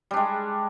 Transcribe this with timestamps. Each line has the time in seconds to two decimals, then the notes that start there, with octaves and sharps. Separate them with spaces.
0.11 G3
0.14 D4
0.17 G#3